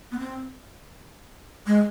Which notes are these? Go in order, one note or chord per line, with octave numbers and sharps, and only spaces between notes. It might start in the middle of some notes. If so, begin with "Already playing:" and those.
B3
C4
G#3